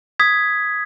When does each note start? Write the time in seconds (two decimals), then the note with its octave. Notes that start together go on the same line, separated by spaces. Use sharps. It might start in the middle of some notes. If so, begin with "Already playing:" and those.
0.19 D#6 G#6 B6